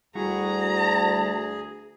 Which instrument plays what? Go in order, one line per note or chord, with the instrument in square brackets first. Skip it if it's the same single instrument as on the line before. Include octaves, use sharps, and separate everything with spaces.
[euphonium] D2 [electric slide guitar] G3 E4 F#4 [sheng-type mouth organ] G#4 [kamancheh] A#5